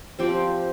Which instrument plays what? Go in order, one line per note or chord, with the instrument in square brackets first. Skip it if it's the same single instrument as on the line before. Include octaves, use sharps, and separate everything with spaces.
[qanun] F3 C4 G4 D5